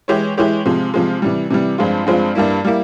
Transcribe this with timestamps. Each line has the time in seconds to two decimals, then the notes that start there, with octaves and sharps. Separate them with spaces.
0.08 E3 G#3 E4 G4 C#5
0.37 E3 G#3 E4 G4 C#5
0.66 C3 F3 G#3
0.94 C3 F3 G#3
1.22 C3 E3 G3
1.50 C3 E3 G3
1.78 G2 F3 G#3 C4 F4
2.07 G2 F3 G#3 C4 F4
2.35 G2 G3 A#3 E4
2.65 G3 A#3 E4